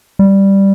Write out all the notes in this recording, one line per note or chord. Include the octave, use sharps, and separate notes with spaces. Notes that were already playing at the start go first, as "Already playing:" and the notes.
G3